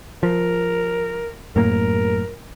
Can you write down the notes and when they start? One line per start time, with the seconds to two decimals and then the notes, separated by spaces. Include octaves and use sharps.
0.23 F3 A#4
1.56 F#2 A2 A#3 A#4